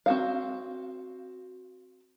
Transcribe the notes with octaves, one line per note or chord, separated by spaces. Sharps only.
C4 F#4 F5